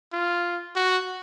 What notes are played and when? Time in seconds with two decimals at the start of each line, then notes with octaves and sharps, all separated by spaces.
0.13 F4
0.76 F#4